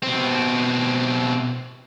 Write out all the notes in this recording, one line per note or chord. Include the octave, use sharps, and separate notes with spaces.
B2 C4